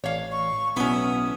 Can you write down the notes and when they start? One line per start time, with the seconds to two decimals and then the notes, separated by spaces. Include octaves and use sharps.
0.04 A1 C#5 F5
0.32 C#6
0.76 B1 F#3 B3 C#4 E4 D#6